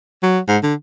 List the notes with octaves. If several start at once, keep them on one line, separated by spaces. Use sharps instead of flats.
F#3
G#2
D3